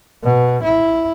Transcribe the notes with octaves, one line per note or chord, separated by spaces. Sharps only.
B2
E4